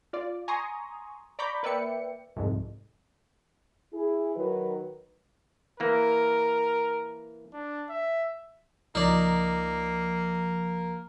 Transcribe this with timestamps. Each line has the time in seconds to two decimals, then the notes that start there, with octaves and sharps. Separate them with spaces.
0.13 F4 D5
0.48 G#5 A#5 C6 C#6 D#6
1.39 D5 A#5 B5 C#6 D6 G6
1.63 A#3 B4 D5 E5 G5 C#7
2.36 C2 F2 G#2
3.93 E4 G#4
4.36 D#3 F#3 B4
5.80 E3 A#3 A#4
7.53 D4
7.89 E5
8.95 C#2 F3 A#3 D#4 D5